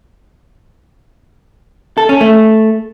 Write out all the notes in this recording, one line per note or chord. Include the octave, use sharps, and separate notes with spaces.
A4
C#4
A3